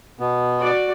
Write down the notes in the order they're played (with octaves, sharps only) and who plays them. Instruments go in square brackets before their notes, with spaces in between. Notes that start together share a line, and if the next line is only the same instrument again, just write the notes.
[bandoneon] B2 B3
[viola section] F#4 D5